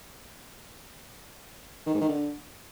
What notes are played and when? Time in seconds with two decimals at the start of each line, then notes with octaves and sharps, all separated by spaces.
1.87 D#3
1.94 G#2
2.01 D#3
2.08 D3